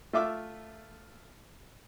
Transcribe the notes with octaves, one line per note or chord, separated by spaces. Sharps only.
A3 F4 E5 D6 F6